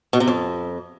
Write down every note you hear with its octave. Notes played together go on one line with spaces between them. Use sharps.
B2
C3
F2